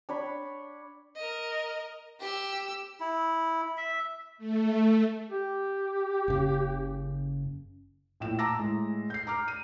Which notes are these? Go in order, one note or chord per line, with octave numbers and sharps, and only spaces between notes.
D4 C#5 B5
A#4 D#5
G4 E6
E4
E5
A3
G4
F#1 C#3
A#1 A2 G5 E7
A5 A#5 D6 E6 A#6
A2 G#3
G6 C7
A#5 D6 F6
D#7